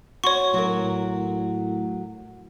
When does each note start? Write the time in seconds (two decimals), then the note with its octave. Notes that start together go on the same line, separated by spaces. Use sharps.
0.24 F#4 C#5 C6 C#6
0.54 A2 F#3 A#4